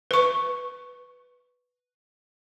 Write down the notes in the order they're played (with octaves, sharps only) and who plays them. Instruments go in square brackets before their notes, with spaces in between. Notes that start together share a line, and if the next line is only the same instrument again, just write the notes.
[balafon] B4 C#6